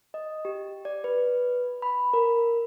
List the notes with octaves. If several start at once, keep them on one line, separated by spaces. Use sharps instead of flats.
D#5
G4
D5
B4
B5
A#4